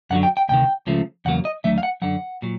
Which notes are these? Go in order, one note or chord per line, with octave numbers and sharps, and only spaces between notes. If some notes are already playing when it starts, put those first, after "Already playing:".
F#2 D3 F#3 F#5
G5
G5
D2 C3 D#3 G5
C#2 C#3 F3 A3
E2 C#3 F#3 A#3 F#5
D#5
D#2 D3 F#3 A3 E5
F5
F#5
F#2 D3 F#3 F#5
A#2 F#3